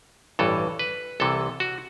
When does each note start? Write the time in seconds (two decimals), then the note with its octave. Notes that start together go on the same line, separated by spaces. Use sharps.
0.39 A1 G2 E3 A4
0.79 B4
1.20 C2 C3 E3 A4
1.60 F#4